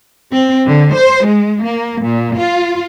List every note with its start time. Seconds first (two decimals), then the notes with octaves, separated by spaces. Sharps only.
0.32 C4
0.66 D3
0.95 C5
1.26 G#3
1.63 A#3
2.02 A#2
2.38 F4